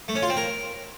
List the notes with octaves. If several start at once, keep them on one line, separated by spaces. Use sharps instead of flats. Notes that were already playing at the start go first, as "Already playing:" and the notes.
A3
C#4
F4
C4
A#4